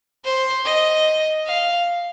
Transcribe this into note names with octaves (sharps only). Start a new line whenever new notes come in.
C5
D#5
F5